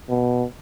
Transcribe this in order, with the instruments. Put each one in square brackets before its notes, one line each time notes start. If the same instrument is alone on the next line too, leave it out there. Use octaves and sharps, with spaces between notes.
[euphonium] B2